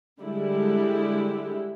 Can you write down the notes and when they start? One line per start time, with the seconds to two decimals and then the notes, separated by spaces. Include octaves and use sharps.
0.21 D3 G3 G#3 E4 G4